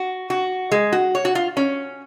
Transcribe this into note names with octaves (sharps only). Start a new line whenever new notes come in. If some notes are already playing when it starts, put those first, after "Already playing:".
Already playing: F#4
F#4
G#3
F#4
C#5
F#4
F4
C#4